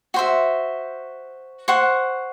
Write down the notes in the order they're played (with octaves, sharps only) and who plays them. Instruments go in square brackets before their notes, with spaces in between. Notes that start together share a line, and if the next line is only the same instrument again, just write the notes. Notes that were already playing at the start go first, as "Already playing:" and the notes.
[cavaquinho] F#4 C5 E5
C5 F#5 C#6